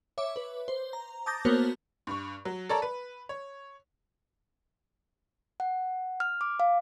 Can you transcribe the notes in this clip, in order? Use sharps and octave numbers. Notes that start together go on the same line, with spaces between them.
C#5 E5 D6
B4
C5
A#5
A5 D6 D#6 G6 A6 A#6
A#3 B3 F#4 A#4 C5 C#5
G2 C#6
F#3
A4 A#4 C#5 D5 A5 A#5
B4
C#5
F#5
F6
D6
F5